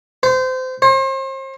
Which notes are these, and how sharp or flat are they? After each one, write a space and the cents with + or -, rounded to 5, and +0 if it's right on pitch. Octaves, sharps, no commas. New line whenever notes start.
C5 -25
C5 +40